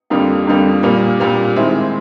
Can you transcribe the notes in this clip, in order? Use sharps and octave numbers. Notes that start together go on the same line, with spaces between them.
F2 D3 G3 A#3
F2 D3 G3 A#3
A#2 G3 A#3
A#2 G3 A#3
D#3 G#3 C4 E4